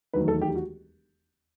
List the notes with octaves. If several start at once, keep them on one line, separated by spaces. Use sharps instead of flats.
E1 D#2 D#3 F#3 A3 B4
A4
G4
F#4